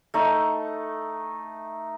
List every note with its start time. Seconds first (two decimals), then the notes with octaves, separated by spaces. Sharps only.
0.14 A3 D#4